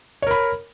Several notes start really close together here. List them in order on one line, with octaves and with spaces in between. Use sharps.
C#5 A#4 B5